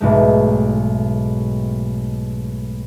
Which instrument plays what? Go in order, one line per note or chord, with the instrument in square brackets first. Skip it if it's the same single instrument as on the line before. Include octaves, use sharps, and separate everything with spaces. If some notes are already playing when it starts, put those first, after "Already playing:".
[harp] B1 G#2 G#3 A3